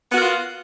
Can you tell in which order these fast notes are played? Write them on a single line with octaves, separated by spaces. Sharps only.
B3 F#4 A#4 F4